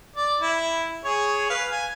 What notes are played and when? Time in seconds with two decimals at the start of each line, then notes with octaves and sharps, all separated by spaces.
0.16 D5
0.40 E4
1.04 G#4 C#5
1.50 B4 F5
1.71 G#5